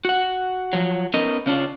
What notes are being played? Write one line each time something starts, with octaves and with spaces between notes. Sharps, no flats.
F#4 F#5
F3 F#3
B3 C#4 D#4 A#4 D#5
C#3 C#4 D4 F4